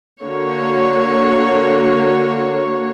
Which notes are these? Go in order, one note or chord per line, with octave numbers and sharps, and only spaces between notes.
D3 A#3 F#4 C#5